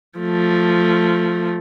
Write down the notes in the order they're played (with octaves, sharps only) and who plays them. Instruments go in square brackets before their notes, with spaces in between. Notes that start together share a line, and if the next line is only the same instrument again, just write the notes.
[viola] F3 A3